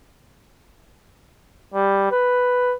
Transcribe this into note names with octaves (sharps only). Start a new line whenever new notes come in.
G3
B4